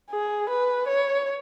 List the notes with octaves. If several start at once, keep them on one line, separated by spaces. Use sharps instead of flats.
G#4
B4
C#5